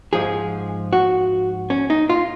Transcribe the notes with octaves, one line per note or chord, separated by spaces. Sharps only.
G#2 F3 G#4
F#4
C#4
D#4
F4